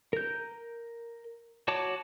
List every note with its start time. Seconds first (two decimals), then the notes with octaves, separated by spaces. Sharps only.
0.13 A#4 G6
1.68 F#4 C#5 A5 D6